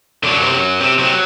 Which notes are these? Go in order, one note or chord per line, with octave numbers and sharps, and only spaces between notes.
F#2 D3 F#3 D4
C3 C4
C3 C4
C3 F#3 C4